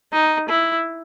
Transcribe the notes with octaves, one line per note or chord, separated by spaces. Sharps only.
D#4
E4